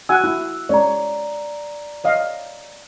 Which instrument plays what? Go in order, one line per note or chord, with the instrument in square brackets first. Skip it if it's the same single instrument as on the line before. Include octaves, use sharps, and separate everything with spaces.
[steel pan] F#4 F#5 G#5 [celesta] E6 F#6
[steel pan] E4
[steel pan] G#3 C#4 C#5 [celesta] D5 A#5
[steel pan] C#5 D#5 F5